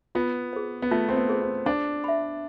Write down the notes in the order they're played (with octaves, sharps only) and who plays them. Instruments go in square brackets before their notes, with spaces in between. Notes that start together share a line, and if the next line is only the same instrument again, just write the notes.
[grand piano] B3 [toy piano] F4
[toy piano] G#4 C5
[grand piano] B3
[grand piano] A3 [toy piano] F4
[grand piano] C4
B3
[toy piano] G#4 C5
[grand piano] C4
[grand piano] D4 [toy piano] C5
[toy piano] E5 B5